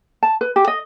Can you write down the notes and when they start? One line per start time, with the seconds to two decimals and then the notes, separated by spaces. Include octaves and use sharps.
0.23 A5
0.41 B4
0.56 G4
0.68 D#5